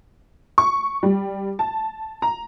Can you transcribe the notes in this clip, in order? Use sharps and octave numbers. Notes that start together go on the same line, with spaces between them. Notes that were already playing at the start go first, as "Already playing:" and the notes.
C#6
G3
A5
A#5